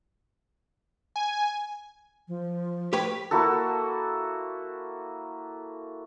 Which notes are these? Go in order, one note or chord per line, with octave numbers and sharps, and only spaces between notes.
G#5
F3
G4 B4 C#5
A#3 E4 F#4 A4